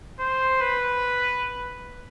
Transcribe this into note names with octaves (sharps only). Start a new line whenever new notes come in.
C5
B4